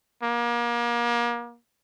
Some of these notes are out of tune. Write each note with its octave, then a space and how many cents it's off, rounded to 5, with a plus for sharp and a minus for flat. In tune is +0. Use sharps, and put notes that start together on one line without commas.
A#3 +35